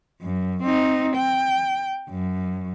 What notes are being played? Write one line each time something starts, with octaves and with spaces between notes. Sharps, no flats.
F#2
C4 D#4
G5
F#2